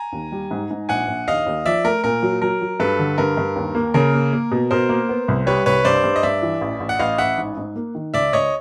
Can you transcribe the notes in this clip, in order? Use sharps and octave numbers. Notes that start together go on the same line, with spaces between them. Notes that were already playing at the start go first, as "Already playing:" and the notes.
Already playing: G#5 A#5
D#2
G3
G#2
G#2
A#1 F#5 G#5
A#1
D#2 D#5 F5
D#2
F3 D5 E5
A3 A#4
A#2 A#4
F#3
F#3 A#4
F#3
G2 A4 B4
D3
G2 A#4
G2
D#2
A#3
C#3 A#4
A#3
A#3
B2
B2 A#4 C5
A#3
B3
C2
G3 B4 C#5
C2 B4 C#5
G2 C5 D5
G2
D#5
G2 D5 E5
E3
A1
A1
F#5
A1 D#5 F5
A1 E5 F#5
G#2
G#2
A#3
D#3
C#2 D5 E5
C#2 C#5 D#5